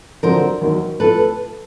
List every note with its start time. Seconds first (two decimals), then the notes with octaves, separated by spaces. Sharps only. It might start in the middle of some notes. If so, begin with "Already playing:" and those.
0.23 F2 D3 F#3 A#4 C5
0.61 E1 D#2 D#3 F#3 A#3
1.00 F3 A3 A4 B4